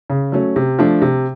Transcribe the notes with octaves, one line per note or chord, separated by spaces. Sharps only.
C#3
F#3 A3 C#4
C3
F3 A3 D4
C3